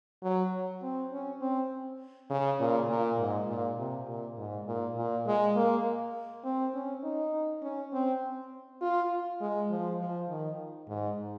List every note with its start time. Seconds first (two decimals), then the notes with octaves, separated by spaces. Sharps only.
0.23 F#3
0.82 C4
1.12 C#4
1.41 C4
2.30 C#3
2.60 A#2
2.89 A#2
3.19 G#2
3.48 A#2
3.78 C3
4.08 A#2
4.38 G#2
4.67 A#2
4.96 A#2
5.27 G#3
5.56 A#3
6.45 C4
6.74 C#4
7.04 D#4
7.62 C#4
7.93 C4
8.82 F4
9.41 G#3
9.70 F3
10.00 F3
10.29 D#3
10.88 G#2